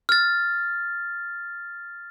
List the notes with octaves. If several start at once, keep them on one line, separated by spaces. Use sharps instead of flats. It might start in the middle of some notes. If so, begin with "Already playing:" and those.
F6 A6